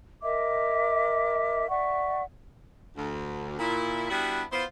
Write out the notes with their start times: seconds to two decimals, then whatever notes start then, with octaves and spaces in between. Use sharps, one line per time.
0.22 A#4 D#5 E5 D6
1.68 D5 E5 F#5 C#6
2.97 D2
3.59 A#2 E4
4.10 G3 B3 D4 E4 F#4
4.52 B3 E4 F4 C5